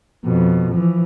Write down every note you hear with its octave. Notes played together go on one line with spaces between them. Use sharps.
F2 B2
E3 F3